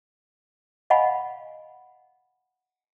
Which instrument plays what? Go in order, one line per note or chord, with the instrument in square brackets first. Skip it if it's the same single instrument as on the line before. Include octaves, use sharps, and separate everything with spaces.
[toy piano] D#5 F5 F#5 G#5 B5